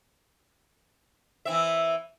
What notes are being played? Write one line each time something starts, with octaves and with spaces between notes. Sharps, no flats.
E3 C4 E5